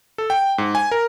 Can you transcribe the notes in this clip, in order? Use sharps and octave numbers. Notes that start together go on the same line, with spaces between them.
A4
G5
G#2
G#5
A#4